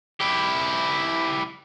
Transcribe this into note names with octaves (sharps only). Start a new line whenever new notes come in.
E4 G4